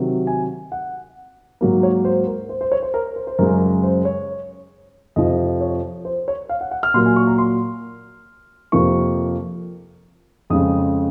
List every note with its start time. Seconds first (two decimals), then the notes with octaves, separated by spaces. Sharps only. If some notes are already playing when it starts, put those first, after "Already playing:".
Already playing: C3 D#3 F#3
0.27 G#5
0.72 F#5
1.61 G#2 F#3 A#3
1.83 C#5
2.05 C5
2.27 A#4
2.49 C5
2.61 C5
2.72 C#5
2.82 C5
2.94 A#4
3.16 C5
3.27 C5
3.39 F#2 C#3 G#3 A#4
3.83 C5
4.05 C#5
5.16 F2 C3 F3 D#5
5.61 C#5
6.05 C5
6.28 C#5
6.49 F5
6.61 F#5
6.71 F#5
6.83 F6
6.94 A#2 F#3 A#3 C6
7.06 G#5
7.16 C#6
7.27 A#5
7.38 C6
8.72 F2 C3 F3 A#3 C#6
10.50 F2 C#3 G#3 D#6